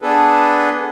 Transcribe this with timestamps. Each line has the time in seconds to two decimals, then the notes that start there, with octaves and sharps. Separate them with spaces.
0.02 B3 D4 G#4 A4 B4